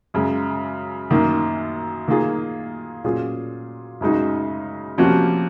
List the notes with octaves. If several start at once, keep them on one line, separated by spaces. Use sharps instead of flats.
F#2 C#3 G#3
F#2 D#3 A#3
D#3 A#3 F4 G#4
A#2 F#3 C#4 F4 G#4
F#2 C#3 G#3 D#4 F#4
C3 F3 A#3 C#4 F#4